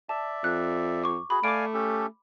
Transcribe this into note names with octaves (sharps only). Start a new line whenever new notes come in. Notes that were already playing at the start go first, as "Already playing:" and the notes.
D5 E5 A5
F2 F#6
C#6 D6
F#4 G#4 B5
A3 D5 F5 G#5 D6 D7
C#4 G4 A4